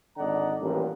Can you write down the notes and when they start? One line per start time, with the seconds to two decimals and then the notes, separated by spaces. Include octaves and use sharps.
0.17 G#1 D3 D5 D#5 F#5 A#5
0.61 A1 G2 A#2